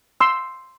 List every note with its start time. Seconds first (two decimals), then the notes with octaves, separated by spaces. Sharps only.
0.20 C6 E6